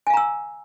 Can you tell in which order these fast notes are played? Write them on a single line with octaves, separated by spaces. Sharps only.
G#5 F5 A#5 E6